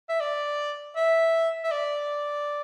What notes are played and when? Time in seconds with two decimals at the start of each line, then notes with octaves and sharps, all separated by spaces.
0.09 E5
0.20 D5
0.96 E5
1.64 E5
1.71 D5